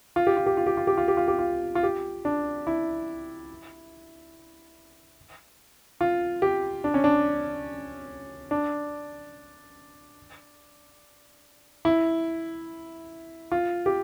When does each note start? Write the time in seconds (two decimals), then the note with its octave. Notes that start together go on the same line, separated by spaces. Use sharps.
0.16 F4
0.27 G4
0.37 F4
0.46 G4
0.57 F4
0.66 G4
0.77 F4
0.87 G4
0.97 F4
1.08 G4
1.17 F4
1.28 G4
1.39 F4
1.75 F4
1.83 G4
2.25 D4
2.67 E4
6.01 F4
6.42 G4
6.84 D4
6.94 C#4
7.04 D4
8.51 D4
11.85 E4
13.52 F4
13.86 G4